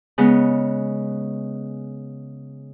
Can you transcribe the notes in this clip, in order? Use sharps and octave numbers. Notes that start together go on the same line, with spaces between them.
C#3 G#3 B3